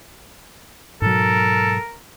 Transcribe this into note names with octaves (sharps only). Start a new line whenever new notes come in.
G#2 B2 F#3 A4 A#4